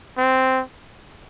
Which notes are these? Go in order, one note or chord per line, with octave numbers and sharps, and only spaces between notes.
C4